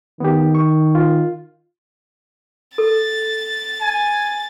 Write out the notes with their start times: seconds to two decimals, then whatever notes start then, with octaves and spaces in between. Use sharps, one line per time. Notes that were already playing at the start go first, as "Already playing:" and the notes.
0.20 D#3 B3 G4
0.55 C#6
0.95 F4
2.78 A4 A6
3.81 G#5